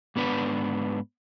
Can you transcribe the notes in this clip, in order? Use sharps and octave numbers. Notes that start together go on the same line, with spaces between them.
G#2 B3 D4 B4